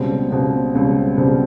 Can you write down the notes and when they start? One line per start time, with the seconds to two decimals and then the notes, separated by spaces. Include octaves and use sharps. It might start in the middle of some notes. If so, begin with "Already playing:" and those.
Already playing: C#2 B2 G3 C4
0.31 C#2 B2 G3 C4
0.74 C#2 B2 G3 C4
1.17 C#2 B2 G3 C4